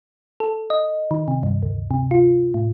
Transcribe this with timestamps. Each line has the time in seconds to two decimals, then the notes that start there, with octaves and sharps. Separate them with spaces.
0.40 A4
0.70 D#5
1.11 D#3
1.28 C3
1.43 G2
1.63 D2
1.91 C3
2.11 F4
2.54 A2